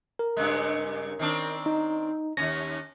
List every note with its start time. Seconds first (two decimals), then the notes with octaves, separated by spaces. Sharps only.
0.19 A#4
0.37 G2 C#3 G#3
1.19 D#3 C4 D4
1.66 D#4
2.37 D#2 C#4 A#6